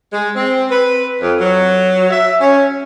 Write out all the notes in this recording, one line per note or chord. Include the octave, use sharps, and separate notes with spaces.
G#3
C4
B4
F2
F#3
E5
C#4